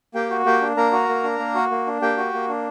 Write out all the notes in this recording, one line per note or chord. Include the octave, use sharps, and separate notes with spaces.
A#3 G4 G5
F#4
A#3 G4 G5
D4
A#3 A#4 A#5
F#4
A#3
D4
A#3
F#4
A#3
D4
A#3 G4 G5
F#4
A#3
D4